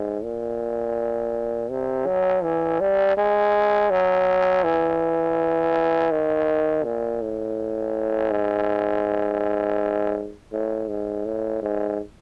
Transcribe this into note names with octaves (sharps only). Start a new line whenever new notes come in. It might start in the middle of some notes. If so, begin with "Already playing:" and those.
Already playing: G#2
A#2
C3
F#3
E3
G3
G#3
F#3
E3
D#3
A#2
A2
G#2
A2
G#2
A2
G#2